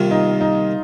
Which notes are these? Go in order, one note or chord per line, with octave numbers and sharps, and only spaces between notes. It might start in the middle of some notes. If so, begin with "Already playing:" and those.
Already playing: C2 C3 D#3 A#3 F4
D#4
D#4